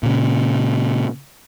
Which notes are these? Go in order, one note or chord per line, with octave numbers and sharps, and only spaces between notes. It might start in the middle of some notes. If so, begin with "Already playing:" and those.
A#2 C#3